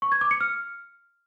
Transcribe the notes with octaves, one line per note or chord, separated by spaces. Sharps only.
C#6
G#6
D6
C#7
F6